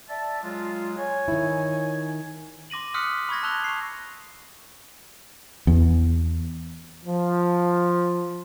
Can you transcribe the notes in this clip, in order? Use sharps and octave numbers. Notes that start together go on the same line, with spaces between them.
D5 E5 A5
F#3 G#3 F4
C#5 G#5
D#3 E4
C6 D6 A#6 D#7 F#7
C6 D#6 F6 F#6 B6 C#7
B5 C#6 G#6 A#6
A5 E6 F#6 F7 G7
C#6 C7
E2
F3